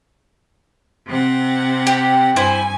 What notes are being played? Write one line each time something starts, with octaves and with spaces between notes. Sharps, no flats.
C3 C4 F#5
G4
G2 E4 C5 G#5